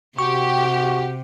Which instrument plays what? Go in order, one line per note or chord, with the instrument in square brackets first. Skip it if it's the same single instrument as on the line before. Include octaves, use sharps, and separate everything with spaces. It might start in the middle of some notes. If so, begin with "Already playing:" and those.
[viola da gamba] C3 [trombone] F#4 [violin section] G4 [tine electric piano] C#6